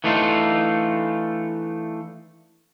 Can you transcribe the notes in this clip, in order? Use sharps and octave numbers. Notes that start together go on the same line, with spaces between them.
E3 A3 D4 D#4 F4